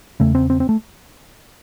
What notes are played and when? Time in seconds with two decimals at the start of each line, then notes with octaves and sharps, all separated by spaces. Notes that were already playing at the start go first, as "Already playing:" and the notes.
0.20 E2 C#3 A3
0.35 C4
0.50 C4
0.60 C4
0.69 A3